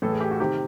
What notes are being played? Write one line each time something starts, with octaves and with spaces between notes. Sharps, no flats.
A2 E3 A4
G#4
G4
F#4
C3 D#3 G4